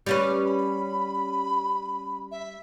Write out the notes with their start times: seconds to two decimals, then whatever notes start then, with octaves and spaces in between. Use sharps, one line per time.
0.06 G3 C#4 B4
0.44 B5
2.31 E5